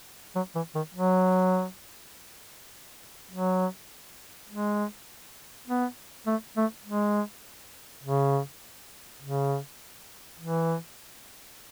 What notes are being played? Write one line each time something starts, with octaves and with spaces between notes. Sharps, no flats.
F#3
E3
D#3
F#3
F#3
G#3
B3
A3
A3
G#3
C#3
C#3
E3